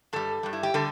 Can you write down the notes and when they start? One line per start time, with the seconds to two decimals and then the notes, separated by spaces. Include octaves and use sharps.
0.13 G2 G3 A4
0.43 G2 G3
0.53 E4
0.63 G4
0.74 D3 G3 A4